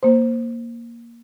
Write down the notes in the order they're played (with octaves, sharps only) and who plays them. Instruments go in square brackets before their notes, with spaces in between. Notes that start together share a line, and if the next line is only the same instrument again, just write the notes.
[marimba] A#3 C5